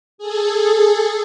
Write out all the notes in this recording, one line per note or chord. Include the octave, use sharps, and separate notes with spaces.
G#4 A4